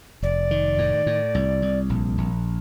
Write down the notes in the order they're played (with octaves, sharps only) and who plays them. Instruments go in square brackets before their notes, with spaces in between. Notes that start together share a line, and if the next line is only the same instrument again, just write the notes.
[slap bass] F1 [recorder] D5
[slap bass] D#3
A2
A2
C2
C2
A#1
A#1